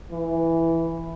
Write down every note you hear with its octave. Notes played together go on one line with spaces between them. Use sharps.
E3